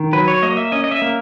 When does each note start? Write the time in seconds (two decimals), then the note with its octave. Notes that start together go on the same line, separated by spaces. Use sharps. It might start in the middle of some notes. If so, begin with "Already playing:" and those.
Already playing: D#3
0.13 F#3 B4
0.28 C#5
0.42 A#3 D#5
0.57 E5
0.72 C#4 D#5
0.84 D#5
0.91 E5
1.02 A#3